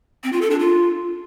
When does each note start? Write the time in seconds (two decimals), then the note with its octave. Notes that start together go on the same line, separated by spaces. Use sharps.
0.24 C4
0.33 F4
0.42 A4
0.51 D4
0.60 F4